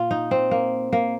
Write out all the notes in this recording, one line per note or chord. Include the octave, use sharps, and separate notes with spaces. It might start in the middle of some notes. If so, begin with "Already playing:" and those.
Already playing: A#2 F4
D#4
C4
A#3
A#3